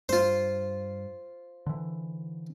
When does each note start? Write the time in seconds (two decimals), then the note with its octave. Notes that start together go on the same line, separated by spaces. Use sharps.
0.09 G2 F4 C5
1.66 D3 E3